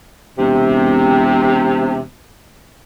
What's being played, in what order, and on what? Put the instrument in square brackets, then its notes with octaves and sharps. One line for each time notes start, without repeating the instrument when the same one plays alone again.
[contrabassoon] E1 [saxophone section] C3